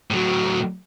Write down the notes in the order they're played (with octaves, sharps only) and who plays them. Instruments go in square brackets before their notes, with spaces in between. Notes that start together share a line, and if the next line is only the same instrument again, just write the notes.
[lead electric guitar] A2 F#3